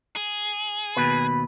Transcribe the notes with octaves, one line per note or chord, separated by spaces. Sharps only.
G#4
D#2 B2 B4 B5